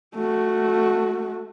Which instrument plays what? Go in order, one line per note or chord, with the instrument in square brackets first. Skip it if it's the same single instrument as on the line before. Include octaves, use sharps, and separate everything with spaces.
[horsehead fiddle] A3 F#4